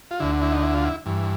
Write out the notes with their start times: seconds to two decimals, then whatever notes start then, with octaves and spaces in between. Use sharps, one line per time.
0.11 F4
0.20 D2 D3 E4
0.42 E4
0.52 D#4
0.63 E4
0.75 F4
0.85 E4
1.06 G2 E3